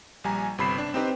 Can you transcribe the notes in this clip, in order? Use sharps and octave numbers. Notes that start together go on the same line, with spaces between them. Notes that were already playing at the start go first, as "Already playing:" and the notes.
A#1 G3 G#5 A#5
G1 C3 B5 C7 E7
D4
C4 D#4 G4 B4 C5